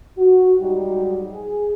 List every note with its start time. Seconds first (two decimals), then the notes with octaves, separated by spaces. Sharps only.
0.17 F#4
0.59 G#2 F#3 G3 D#4 F#4 G4
1.32 G#4